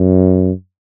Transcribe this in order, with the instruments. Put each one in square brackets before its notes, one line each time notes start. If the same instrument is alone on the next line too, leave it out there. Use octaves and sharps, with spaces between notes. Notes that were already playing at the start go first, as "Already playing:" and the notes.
Already playing: [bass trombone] F#2